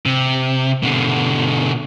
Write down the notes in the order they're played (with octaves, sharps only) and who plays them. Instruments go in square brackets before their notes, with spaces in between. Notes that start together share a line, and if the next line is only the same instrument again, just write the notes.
[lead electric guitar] C3
B2 D3